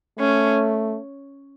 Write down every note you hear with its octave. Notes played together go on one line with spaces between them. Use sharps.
A3 C#4